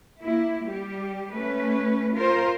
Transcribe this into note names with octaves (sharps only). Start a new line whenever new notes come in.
A#3 E4
G3 G4
A3 C#4 B4
F4 A#4 C5